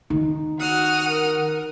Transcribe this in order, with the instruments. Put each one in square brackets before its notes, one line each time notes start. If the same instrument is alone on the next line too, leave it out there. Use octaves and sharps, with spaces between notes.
[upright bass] D#3 [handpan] D#4
[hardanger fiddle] F#4 [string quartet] F#5 D#6 F6
[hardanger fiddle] A#4